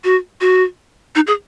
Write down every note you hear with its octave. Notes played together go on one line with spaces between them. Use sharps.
F#4
F#4
D#4
G#4